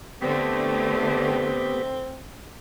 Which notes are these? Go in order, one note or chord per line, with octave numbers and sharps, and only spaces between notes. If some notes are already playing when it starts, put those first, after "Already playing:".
D3 A3 B3 C4 G4